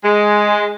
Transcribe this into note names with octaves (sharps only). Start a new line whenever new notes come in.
G#3